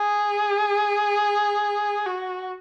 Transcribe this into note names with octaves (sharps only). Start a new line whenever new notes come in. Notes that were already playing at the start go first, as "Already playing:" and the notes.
Already playing: G#4
F#4